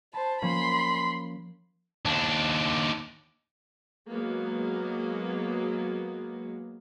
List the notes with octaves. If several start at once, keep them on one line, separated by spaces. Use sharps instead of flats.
C5 A5 B5
F3 A#3 C#4 B5 C6
D#2 D4
F#3 G#3 A#3 B3